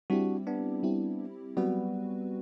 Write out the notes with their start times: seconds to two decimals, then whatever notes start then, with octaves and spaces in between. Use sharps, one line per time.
0.10 G3 C4 D4 E4 F#4 G4
0.47 B3 D4
0.83 G3 C4 E4 G4
1.57 F#3 G3 B3 C4 F#4 B4